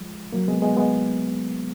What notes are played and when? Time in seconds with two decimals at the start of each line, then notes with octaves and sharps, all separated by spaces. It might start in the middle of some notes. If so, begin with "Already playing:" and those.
Already playing: F3 G#3
0.32 F#3 A#3
0.47 G#3 B3
0.62 G#3 B3
0.76 G#3 B3